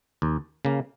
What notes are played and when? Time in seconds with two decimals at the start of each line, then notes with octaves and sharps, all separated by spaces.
0.22 D#2
0.65 C#3 A#3